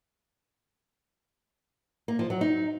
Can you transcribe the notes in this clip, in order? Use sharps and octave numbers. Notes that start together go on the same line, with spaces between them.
A#3
F3
F#3
D#4